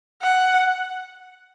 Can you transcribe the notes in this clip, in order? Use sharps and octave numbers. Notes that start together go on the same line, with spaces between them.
F#5